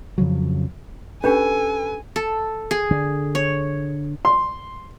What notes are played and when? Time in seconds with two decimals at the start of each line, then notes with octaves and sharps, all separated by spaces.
0.18 F2 C#3 F3 F#3
1.24 C#4 D4 G4 A4 B4 G#5
2.16 A4
2.71 G#4
2.91 D3
3.35 C#5
4.25 C6